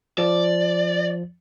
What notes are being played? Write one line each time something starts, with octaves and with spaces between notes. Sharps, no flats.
F3 D5